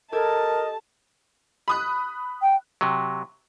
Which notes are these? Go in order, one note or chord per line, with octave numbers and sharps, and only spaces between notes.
G4 A4 A#4 D#5 A5 G#6
B5 D#6 F#6
G5
C3 F#3